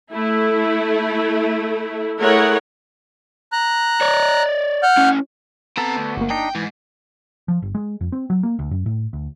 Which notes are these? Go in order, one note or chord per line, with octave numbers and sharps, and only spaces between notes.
A3 E4
A3 E4 G#4 A#4 C#5 F#5
A#5 F#6
C#5 D5
F#5 F6 G6
C#4 E4
B3 C4 A4 A#5
D2
G1 A#3
D4 D#4 G5
G#2 E3
F3
G1
G#3
F2
C4
F#3
A#3
D2
F#2
A2
D2